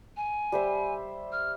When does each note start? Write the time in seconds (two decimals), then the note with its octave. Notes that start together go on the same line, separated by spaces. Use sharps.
0.17 G#5
0.52 G3 C5 E5
1.32 F6